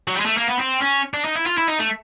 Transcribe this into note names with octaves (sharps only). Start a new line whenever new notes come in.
F#3
G3
G#3
A3
A#3
B3
C4
C#4
D4
D#4
E4
F4
E4
D#4
A3